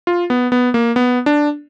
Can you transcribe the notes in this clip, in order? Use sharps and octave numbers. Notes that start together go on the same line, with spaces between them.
F4
B3
B3
A#3
B3
D4